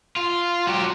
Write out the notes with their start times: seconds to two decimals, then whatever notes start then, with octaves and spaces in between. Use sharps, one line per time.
0.16 F4
0.67 F#3 G4